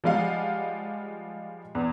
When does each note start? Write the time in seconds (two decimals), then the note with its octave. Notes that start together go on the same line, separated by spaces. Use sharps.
0.04 F3 G3 G#3 F4 F5 F#5
1.75 E2